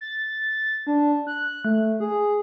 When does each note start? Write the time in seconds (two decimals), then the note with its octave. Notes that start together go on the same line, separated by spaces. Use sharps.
0.01 A6
0.87 D4
1.27 F#6
1.65 A3
2.00 G#4